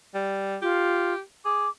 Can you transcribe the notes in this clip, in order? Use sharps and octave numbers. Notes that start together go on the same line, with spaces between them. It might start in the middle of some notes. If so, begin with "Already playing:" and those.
G3
F4 G4
G#4 D6